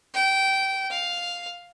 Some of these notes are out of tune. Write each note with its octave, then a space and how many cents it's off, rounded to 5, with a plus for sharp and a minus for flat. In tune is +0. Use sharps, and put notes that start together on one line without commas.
G5 -20
F5 +5